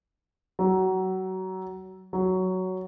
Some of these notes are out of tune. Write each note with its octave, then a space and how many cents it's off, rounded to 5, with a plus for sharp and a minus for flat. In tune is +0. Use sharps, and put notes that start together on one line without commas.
F#3 +25
F#3 +10